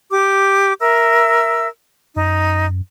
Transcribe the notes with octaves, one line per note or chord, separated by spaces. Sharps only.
G4 D6
A#4 E5 E6
F#2 D#4